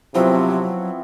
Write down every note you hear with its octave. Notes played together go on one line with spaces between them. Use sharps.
C3 F3 F#3 B3 C4 E4 F#4